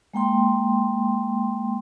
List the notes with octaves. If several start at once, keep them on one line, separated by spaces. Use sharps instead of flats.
G#3 A#3 G5 C6